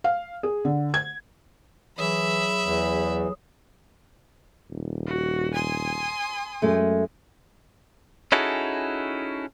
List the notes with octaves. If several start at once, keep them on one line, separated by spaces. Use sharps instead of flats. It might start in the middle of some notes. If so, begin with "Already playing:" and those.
F5
G#4
D3
G#6
E3 F#3 G#4 E5 B5
E2 E3
D#1
F#4
G#5 C6 D#6
F#2 G#3 A3
C#4 D#4 E4 F#4 G#4 A4